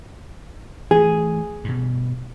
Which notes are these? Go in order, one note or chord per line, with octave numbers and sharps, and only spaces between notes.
E3 A3 G#4
G2 B2